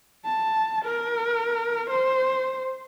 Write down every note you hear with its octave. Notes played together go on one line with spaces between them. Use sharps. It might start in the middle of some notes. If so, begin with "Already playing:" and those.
A5
A#4
C5